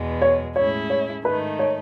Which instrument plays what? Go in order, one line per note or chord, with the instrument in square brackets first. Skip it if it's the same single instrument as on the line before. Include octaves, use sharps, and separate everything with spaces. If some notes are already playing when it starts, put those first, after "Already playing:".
Already playing: [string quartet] E2 B2 G#3 B3
[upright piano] C#5
[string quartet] A2 G#3 C#4 E4 [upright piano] C#5
[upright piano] C#5
[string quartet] G#2 D#3 A3 D#4 [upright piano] B4
[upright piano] C#5